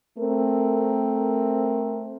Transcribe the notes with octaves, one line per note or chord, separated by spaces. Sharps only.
A3 C4 A#4